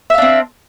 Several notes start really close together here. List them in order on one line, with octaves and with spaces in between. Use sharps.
E5 F5 D4 C4